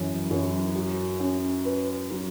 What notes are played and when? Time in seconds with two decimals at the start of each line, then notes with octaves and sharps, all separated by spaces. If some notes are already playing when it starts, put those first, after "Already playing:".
Already playing: F#2 E3
0.31 F#2
0.75 F#4
1.20 C#4
1.65 B4
2.10 F#3